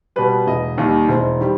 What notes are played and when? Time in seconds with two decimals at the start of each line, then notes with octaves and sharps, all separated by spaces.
0.16 B2 G3 B4
0.47 E1 D#5
0.78 D#2 D#3 G3 D#5
1.09 E1 C5
1.41 D#3 G3